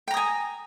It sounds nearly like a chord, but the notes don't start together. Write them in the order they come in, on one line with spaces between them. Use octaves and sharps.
G5 A#5 D#6 G#5